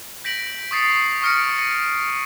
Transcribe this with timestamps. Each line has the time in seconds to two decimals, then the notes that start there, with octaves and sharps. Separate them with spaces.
0.24 G6 A#6 B6 D7 F#7
0.71 C#6 D#6 A6 C7 C#7
1.22 C#6 D#6 F6 A#6 C#7 D7
1.58 A#6 C#7 D#7